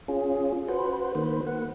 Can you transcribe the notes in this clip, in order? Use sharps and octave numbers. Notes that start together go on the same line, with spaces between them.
C#4 F4 G#4
F#4 B4 C5
D#3 A#3 B4 C5
A#3 F#5